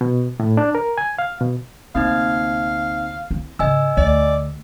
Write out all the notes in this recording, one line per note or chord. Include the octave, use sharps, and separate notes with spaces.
B2
A2
D4
A#4
G#5
F5
B2
D2 C3 A#3 C4 D#4 F5
C4 E4
G#2 C#3 D#5 G#5 E6
D2 D5